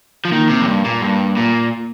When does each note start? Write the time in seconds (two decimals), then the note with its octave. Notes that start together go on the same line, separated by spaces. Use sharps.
0.25 F3
0.32 D#3 A#3
0.49 C3
0.61 F2
0.66 G2
0.84 A#2
1.02 G2
1.37 A#2